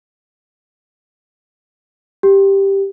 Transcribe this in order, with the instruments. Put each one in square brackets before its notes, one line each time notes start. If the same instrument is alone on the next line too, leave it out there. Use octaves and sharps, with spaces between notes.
[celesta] G4